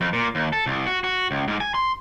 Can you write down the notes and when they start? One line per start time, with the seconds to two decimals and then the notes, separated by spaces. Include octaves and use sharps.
0.01 F2
0.13 A#2
0.35 D#2
0.53 A4
0.66 C2
0.87 F#4
1.04 F#4
1.31 C#2
1.48 G#2
1.60 G#5
1.74 C6